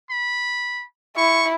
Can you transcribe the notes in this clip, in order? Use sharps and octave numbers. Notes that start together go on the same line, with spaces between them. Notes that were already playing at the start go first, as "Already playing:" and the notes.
B5
E4 C#6